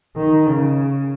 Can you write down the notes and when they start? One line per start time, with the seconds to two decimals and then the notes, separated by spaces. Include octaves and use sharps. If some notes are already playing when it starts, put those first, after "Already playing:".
0.16 D#3
0.47 C#3